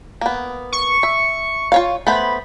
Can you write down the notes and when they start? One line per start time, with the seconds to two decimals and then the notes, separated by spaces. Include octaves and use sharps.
0.21 A#3 B3
0.72 C#6
1.03 E5
1.72 F4 C#5 F5
2.07 A3 B3 C5 B5